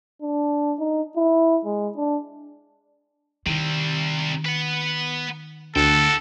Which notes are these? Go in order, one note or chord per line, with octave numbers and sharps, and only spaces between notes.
D4
D#4
E4
G#3
D4
C3 D#3 G3
B4 F#5
D2 F#4 A4 G5